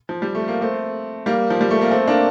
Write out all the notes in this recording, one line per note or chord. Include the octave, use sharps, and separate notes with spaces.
F3
G3
A3
A#3
A3 C4
G3 A#3
F3
G3
A3
A#3
A3 C4
A#3 D4